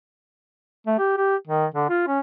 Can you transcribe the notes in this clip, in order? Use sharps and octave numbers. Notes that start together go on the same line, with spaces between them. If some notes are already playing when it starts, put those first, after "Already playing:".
A3
G4
G4
D#3
D3
F4
C#4